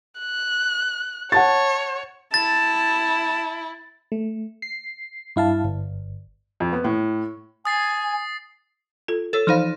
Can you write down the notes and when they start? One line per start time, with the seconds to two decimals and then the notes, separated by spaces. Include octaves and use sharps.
0.20 F#6
1.32 C#5 F#5 A5 A6
2.34 E4 A5 A6
4.12 A3
4.62 C7
5.36 G2 E4 F5 A5
5.65 G1
6.60 F2
6.73 B3
6.84 A2
7.65 G#5 D#6 A6 C7
9.08 F4 A4
9.33 A4 C#5 E6 A6
9.47 E3 F3 D#4 C5 F5 B5